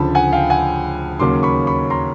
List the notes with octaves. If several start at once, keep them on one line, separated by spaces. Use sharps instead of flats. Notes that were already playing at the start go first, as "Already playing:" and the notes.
Already playing: D2 C#3 F3 A5 B5
F#5 G#5
F5 G5
F#5 G#5
D#2 C#3 F#3 A#3 C#4 C6 D6
B5 C#6
B5 C#6
A#5 C6